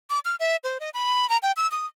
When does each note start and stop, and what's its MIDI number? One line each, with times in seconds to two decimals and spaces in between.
0.10 0.19 86
0.25 0.35 89
0.40 0.56 76
0.64 0.78 72
0.80 0.90 75
0.94 1.29 83
1.29 1.38 82
1.43 1.52 79
1.57 1.70 88
1.72 1.86 87